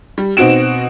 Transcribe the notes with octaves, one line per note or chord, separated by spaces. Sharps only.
G3
B2 C4 D#4 F#4 D7 E7